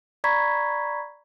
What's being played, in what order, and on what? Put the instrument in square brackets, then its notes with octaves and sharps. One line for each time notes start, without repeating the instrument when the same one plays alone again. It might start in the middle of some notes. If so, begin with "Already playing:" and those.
[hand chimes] D5 A#5 B5 C#6 G#6 B6